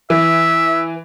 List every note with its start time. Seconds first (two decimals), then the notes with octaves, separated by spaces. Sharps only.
0.10 E3 E5